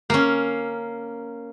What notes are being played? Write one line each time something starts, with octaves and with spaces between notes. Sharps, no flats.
A#3 C#4